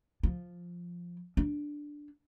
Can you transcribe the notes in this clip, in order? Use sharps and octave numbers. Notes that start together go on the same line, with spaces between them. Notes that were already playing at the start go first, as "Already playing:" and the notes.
F3
D4